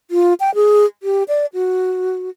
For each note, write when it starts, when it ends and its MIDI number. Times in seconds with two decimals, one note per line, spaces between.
0.11 0.34 65
0.40 0.54 79
0.55 0.85 68
1.03 1.23 67
1.28 1.46 74
1.54 2.30 66